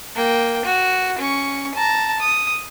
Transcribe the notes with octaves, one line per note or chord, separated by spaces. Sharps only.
A#3 G5
F#4
C#4 C#6
A5 A#5
D#6